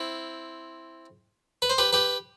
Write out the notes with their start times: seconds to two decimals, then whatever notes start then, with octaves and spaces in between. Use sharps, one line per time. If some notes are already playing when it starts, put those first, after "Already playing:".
Already playing: C4 E4
1.62 B4
1.70 C5
1.78 G4 B4
1.93 G4 B4